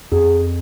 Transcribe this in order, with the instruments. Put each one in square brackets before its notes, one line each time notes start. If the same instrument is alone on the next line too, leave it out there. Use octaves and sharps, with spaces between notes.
[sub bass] F2 [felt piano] G#4